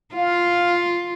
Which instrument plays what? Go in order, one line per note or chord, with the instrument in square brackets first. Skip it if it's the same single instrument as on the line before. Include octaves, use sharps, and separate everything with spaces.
[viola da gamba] F4 [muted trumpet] F5